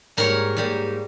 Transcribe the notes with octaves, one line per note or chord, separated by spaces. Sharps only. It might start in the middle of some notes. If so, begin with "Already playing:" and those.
G#2 G3 A#3 A#4 C#5
G#2 G3 A#3